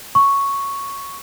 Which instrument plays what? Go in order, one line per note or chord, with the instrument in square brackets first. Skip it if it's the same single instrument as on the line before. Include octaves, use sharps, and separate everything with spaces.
[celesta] C#6